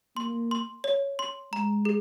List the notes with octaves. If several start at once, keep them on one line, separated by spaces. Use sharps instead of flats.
A#3 C6
C6
C#5
C6
G#3 A#5
G#4